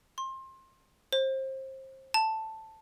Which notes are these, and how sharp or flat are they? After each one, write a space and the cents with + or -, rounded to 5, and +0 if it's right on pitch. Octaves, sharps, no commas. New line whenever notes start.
C6 +25
C5 +25
A5 +5